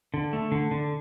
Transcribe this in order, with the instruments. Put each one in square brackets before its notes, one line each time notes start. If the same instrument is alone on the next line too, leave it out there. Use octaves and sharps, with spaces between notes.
[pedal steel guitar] D3
A3
D3
D3